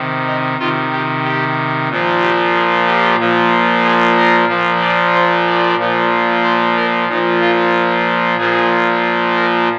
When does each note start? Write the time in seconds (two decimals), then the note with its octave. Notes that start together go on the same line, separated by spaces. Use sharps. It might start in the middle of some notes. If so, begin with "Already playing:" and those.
Already playing: C3 D#3
0.27 D#4
0.59 C3 D#3 F4
0.92 G4
1.24 G4
1.89 A#2 F3
2.22 G4
2.54 G#4
2.86 G4
3.18 A#2 F3
3.84 G#4
4.16 A#4
4.49 A#2 F3
4.81 D5
5.14 C5
5.47 D5
5.79 A#2 F3
6.43 C5
6.76 A#4
7.08 A#2 F3 D#4
7.41 F4
8.38 A#2 F3 G#4
9.36 A#4